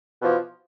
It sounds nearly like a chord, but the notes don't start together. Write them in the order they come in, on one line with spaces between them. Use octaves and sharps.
B2 F3 E3